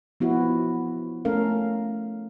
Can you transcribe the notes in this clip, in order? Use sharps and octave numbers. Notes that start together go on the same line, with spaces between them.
F3 B3 E4 F#4
A3 C#4 A4 A#4 F5